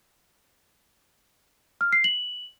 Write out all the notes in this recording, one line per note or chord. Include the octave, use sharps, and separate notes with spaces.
F6
C7
F#7